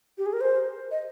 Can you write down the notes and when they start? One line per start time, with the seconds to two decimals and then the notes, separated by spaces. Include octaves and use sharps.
0.18 G4
0.26 G#4
0.33 A#4
0.41 C5
0.91 D#5